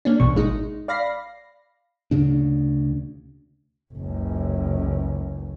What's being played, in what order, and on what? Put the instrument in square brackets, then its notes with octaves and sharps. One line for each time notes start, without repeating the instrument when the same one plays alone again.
[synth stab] A#3 C#4 D4
B1 E2 B2 C#6
G#1 G#3 D#4
D5 F5 B5 A#6 C7
[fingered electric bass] D2 C#3 D4
[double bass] F#1 C#2